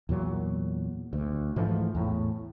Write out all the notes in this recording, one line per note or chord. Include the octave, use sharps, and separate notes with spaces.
E2 A#2 F#3
D2
G#2 E3 F3 A3
E2 A2